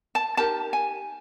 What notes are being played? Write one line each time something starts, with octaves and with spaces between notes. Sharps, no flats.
A5
D#4 G4 A#4 A5
G#5